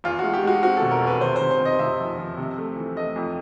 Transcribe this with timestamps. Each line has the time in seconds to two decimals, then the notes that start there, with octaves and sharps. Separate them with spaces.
0.04 E2 F4
0.19 G#3 F#4
0.33 G4
0.43 G#3 F#4
0.63 C4 F#4
0.77 B2 A4
0.91 A#4
1.01 E2
1.07 B4
1.21 C3 C5
1.36 C3 C5
1.51 C5
1.60 C3
1.65 D#5
1.79 C3 E5
1.99 F3
2.18 F3
2.37 C3
2.58 A3
2.76 E3
2.97 A3 D#5
3.16 F2